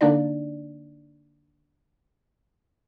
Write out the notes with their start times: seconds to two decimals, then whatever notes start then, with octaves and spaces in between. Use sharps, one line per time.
0.01 D3 A#3 D4 D#4 D5